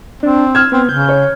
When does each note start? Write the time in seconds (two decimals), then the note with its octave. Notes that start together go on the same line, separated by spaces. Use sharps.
0.23 C4 D4
0.55 E6 F6 G#6
0.72 B3 C4
0.89 C#3 G6
1.09 C#5